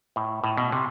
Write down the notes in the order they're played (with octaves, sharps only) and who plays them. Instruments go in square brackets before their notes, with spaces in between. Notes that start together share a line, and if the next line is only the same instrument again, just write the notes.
[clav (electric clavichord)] A2
A2
B2
C3